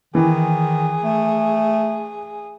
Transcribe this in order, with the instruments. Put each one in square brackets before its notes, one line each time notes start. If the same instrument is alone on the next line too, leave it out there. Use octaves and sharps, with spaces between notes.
[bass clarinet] D#3 [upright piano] E3 [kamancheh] G#4
[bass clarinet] A3